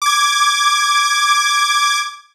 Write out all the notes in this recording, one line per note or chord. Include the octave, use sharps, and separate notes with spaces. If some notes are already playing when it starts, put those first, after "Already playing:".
D6 G#6